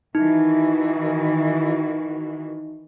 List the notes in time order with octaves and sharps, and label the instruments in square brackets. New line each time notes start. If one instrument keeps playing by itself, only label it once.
[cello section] D#3 E3 F#4 [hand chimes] D#4